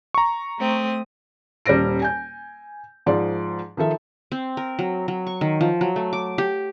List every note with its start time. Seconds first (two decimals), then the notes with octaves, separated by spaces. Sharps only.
0.14 A#5 C#6
0.59 A3 C4 D#6
1.66 D#1 G3 C#4 C5 A#6 D7
2.02 G#5 G6
3.06 G#2 F3 D5
3.77 D#3 F3 A4 E5
4.32 C4
4.57 A#4
4.79 F#3
5.08 F#3
5.27 C#6
5.41 D#3
5.61 F3
5.81 F#3
5.96 A3
6.13 D6
6.38 G4